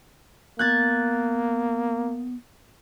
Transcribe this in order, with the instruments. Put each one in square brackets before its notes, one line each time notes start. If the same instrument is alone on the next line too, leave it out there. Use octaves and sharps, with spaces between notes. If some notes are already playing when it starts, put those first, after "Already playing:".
[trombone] A#3 [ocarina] B3 [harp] F#6 G#6 A6